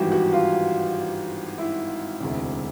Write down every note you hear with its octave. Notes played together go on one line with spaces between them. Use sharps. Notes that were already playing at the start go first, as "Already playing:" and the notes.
Already playing: G#1 G2 E3 F#4 G4
F#4
F4
E4
E1 D2 C3